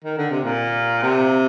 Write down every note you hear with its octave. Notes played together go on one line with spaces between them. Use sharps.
D#3
D3
C3
A#2
C3